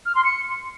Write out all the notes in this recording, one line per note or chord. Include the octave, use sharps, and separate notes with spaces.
F6
C6
C#7